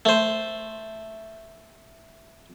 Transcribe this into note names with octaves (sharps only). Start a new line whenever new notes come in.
A3 C5